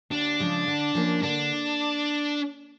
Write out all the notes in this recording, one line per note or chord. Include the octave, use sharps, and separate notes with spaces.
D#2 D4
C#3 F3 G#3
D3
F3 A#3 C#4
D3 D4